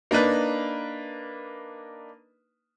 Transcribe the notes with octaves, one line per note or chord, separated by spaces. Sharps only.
A#3 D4 D#4 B4